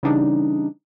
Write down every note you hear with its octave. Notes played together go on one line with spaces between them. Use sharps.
C#3 E3 G3 D4 D#4